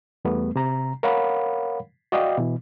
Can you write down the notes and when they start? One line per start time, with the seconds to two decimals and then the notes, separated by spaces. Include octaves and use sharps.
0.25 E2 G3 A3 B3
0.56 C3 A#5
1.03 A#4 C#5 F5 F#5 B5
2.12 F#4 D5 D#5 F5 G5
2.38 B2 E3